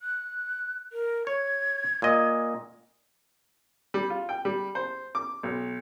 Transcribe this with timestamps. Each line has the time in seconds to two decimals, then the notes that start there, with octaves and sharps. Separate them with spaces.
0.02 F#6
0.93 A#4
1.27 C#5 G#6
2.02 A#2 D#5
3.94 G3
4.10 F4
4.29 G5
4.45 G3
4.75 C5
5.15 D6
5.43 B1